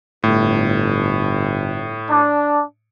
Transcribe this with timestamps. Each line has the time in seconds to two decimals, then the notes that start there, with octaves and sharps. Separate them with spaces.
0.24 G1 A2
2.11 D4